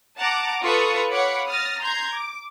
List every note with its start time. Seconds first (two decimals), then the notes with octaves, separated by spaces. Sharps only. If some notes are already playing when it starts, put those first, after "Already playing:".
0.19 F#5 A5 A#5 D6
0.63 F4 A4 B4 C#6 D#6 C#7
1.10 C#5 F5 F#5 B5 D6 C#7
1.48 D#6 F6 A6 A#6
1.82 A#5 C6 G6 G#6
2.13 D6